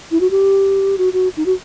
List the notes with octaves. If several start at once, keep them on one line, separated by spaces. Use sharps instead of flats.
E4
F#4
G4
F#4
F#4
D#4
F#4